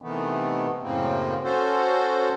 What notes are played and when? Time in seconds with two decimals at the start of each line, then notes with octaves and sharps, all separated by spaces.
0.02 C3 D#3 E3 A3 B3
0.82 F#2 A2 C#3 A#3 C4
1.44 C#4 F#4 A4 C5